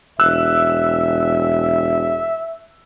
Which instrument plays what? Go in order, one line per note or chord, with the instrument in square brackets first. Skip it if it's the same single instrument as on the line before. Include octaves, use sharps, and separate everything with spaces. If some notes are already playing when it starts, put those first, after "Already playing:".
[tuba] E1 [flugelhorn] E5 [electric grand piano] E6 F#6